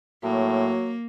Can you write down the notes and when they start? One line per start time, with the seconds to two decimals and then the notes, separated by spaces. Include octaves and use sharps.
0.23 A2 F#3 A#3